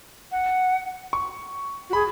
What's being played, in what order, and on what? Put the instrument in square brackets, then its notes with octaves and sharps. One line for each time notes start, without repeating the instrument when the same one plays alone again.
[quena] F#5
[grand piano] C#6
[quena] F#4
[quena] G#4 [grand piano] B5